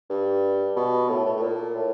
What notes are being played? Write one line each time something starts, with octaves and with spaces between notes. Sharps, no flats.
G2
B2
A2
A2
A2
A#2
A2